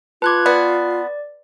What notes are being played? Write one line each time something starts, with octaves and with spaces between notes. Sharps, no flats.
F4 B4 A5 C6 D6 F#6 G#6
B3 D5